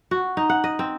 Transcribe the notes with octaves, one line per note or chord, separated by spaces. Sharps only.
F#4
D#4
F#5
D#5
C4